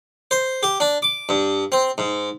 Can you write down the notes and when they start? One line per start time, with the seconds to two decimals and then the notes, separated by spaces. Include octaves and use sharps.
0.31 C5
0.63 G4
0.80 D4
1.02 D6
1.29 G2
1.72 C4
1.98 G#2